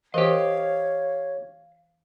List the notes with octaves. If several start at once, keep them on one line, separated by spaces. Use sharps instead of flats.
E3 G4 A#4 C5 C#5 D#5 F5